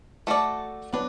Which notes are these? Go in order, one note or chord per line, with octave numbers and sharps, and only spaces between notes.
A3 F#4 A4 D5
F#3 B3 D4 B4